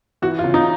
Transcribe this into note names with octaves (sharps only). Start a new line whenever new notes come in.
E3 F#4
F4
C#3
D#4